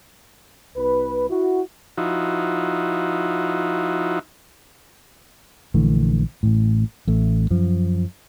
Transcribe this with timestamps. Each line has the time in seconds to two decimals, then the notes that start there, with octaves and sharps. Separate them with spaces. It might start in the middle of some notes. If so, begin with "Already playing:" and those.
0.76 C2 B4
1.29 E4 F#4
1.98 F3 D#4 E4 F#4
5.74 A#1 D3 E3 A3
6.43 A1 A2
7.08 A1 A3
7.50 F#2 F3